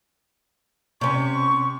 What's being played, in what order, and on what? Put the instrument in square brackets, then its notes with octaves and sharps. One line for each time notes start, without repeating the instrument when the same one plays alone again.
[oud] C3 C#4 [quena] C#6